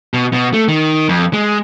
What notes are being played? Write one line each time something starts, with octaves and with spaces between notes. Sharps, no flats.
B2
B2
A3
D#3
F2
G#3